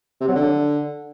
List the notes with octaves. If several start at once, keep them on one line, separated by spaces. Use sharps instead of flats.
C3
F#3
D3